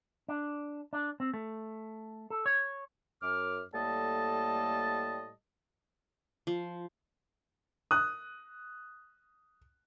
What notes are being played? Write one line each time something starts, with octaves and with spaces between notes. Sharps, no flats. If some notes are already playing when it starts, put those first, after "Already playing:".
D4
D4
C4
A3
A4
C#5
F#2 D6 F6
A2 G3 A#3 A4 D#5 A5
F3
D#6 F#6